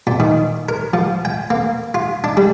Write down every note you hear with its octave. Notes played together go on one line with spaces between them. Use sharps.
A#2
D#3
A#4
F3
G5
A#3
F4
D4
G3